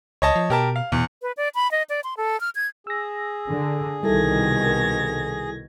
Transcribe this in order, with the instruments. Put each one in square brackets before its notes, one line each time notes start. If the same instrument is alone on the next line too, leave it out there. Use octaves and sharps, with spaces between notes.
[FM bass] C#2 [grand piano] C#5 D#5 A5
[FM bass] F3
[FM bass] B2 [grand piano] G4 A#4 A5
[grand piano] F5
[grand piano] E2 [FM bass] B2
[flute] B4
D5
B5
D#5
D5
C6
A4
F6
G#6
[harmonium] G#4 [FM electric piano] E6 A#6
[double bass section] D3
[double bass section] C2 D#3 [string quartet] B2 G#6 A#6 [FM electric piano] G3 E4 A4